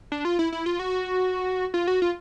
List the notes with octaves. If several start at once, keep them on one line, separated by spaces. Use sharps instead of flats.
D4
F4
E4
E4
F4
F#4
F4
F#4
F4